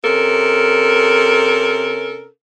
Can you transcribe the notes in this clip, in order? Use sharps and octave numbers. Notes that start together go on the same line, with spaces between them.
C3 C#4 A4 A#4